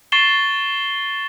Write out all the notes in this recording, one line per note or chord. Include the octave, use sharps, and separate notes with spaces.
C#6 A6 C7 E7 G7